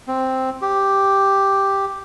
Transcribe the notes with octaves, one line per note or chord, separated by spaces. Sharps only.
C4
G4